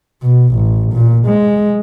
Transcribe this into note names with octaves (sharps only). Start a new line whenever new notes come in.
B2
A1
A#2
G#3